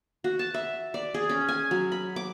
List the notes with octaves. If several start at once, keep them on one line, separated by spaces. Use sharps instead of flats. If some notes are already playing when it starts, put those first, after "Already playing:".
F#4
A5
E5
D5
G#4
C#4
G#5
F#3
B5
D6